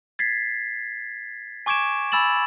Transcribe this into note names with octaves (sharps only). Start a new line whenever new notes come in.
G#6 A6 B6 C7
G#5 C#6 D6 G#6 D7 E7
G#5 B5 E6 A6 E7 F#7